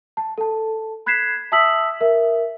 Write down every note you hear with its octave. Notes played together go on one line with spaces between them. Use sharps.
A5
A4 A5
B5 F#6 G#6 B6 C7 E7
E5 A5 D#6 E6 B6 F#7
A#4 E5